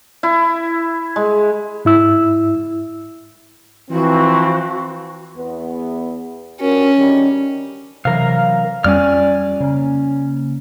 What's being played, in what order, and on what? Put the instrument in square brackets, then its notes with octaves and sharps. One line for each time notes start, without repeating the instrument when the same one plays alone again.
[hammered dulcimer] E4
G#3
[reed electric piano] G#2 E4 E6
[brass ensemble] E3 F3 C4 [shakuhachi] F#4
[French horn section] E2 B3
[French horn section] G2 F#4 A#4 [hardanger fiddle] C#4
[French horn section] D3 D#3 G3
[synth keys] C3 E3 [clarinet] F#3 [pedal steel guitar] A#4 F5
[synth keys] F2 G3 C#4 [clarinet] D5 [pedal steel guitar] G#5 F6
[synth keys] C#3 A#3 [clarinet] C#4